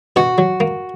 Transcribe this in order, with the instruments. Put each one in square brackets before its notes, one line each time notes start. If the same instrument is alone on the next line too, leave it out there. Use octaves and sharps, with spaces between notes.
[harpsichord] B2 [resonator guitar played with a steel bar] F#4
[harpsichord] F#3
A#3